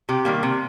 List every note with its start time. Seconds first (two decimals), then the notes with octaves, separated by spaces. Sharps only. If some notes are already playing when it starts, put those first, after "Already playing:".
0.09 C3 G4
0.25 D#3 G3 A#3
0.43 C3